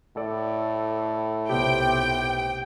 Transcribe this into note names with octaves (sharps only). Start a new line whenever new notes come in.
A2 A4 D5
B1 C3 B3 G4 G5